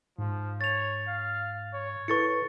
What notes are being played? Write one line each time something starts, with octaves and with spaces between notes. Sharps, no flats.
G#2 F3
C#5 A6 F7
F5
C#5
E4 A4 B4 C#6 A6 C#7